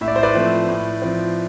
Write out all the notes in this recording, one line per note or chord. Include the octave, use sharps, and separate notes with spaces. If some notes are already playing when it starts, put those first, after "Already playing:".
A2 E5
D5
C5
B4 D5
F3 A3 C4
A2
F3 C4